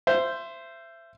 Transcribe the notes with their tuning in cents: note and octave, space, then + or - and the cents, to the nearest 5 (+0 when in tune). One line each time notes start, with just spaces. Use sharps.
C5 -5 E5 +25